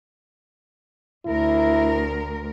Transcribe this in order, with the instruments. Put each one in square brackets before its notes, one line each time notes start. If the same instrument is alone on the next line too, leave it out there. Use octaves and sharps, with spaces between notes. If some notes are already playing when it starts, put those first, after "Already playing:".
[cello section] D2 A#4 [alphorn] E4